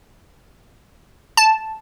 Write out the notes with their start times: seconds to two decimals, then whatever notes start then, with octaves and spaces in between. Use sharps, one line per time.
1.37 A5